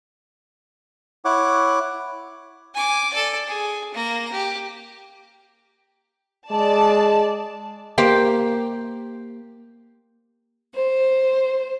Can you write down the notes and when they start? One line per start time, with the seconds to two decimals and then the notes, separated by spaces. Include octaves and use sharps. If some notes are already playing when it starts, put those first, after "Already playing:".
1.25 E4 C#5 F#5 D6
2.74 G#5 D6
3.13 A4 D5
3.47 G#4
3.94 A#3 A#5
4.32 G4
6.51 G#3 D5 A5
7.98 A#3 G4 C5
10.74 C5